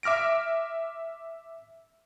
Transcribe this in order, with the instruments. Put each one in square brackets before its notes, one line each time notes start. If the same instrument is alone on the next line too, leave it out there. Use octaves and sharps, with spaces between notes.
[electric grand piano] E5 D6 F6 A#6 D7